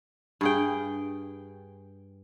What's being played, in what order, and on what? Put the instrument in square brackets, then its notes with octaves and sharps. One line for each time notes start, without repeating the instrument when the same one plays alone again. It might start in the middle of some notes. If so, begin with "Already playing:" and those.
[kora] G2 G#4 G5